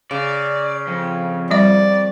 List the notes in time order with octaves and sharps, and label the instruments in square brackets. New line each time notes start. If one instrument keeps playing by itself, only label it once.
[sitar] C#3 [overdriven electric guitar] D5
[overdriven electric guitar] F2
[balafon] G3 E5 [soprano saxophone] D5